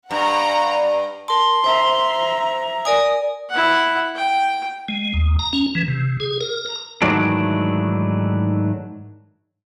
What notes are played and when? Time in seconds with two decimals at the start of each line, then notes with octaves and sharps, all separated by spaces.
0.11 G2 F#5 A#5
1.28 A#4 A5 C6
1.64 C5 E5 A#5
2.85 A#4 D5 G#5 D#6
3.50 E4 F#5
4.16 G5
4.88 G#3
5.14 D#2
5.39 A#5
5.53 C#4
5.75 E3
5.88 C3
6.20 G#4
6.41 A#4
6.66 A#5
7.02 G#2 D#3 E3 F#3 A3 D4